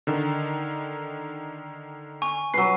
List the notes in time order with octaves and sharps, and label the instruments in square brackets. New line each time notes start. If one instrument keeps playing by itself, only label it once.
[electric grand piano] D3 D#3
[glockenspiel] G#5 C#6
[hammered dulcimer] F#3 B4 [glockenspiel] C7